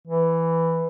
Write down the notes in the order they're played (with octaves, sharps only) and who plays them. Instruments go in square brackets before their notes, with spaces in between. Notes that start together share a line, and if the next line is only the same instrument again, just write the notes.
[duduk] E3